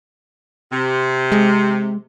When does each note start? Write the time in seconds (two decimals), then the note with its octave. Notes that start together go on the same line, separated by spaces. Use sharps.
0.71 C3
1.32 G#3